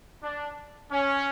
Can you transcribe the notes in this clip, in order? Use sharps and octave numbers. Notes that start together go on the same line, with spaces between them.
D4
C#4